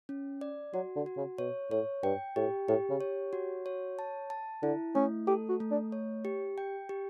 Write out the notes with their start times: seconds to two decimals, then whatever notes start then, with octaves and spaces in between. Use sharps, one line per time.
0.09 C#4
0.41 D5
0.74 F#3 F#4
0.96 D3
1.06 F#4
1.17 C#3
1.38 B2 C#5
1.71 A2 C#5
2.03 G2 G5
2.36 A2 G4
2.68 A2 G4
2.90 C#3
3.01 C#5
3.33 F#4
3.66 C#5
3.99 A5
4.30 A5
4.63 D3 E4
4.95 A3 C#4
5.27 G4 A4
5.49 F#4
5.60 A3
5.71 D4
5.92 C#5
6.25 G4
6.58 G5
6.89 G4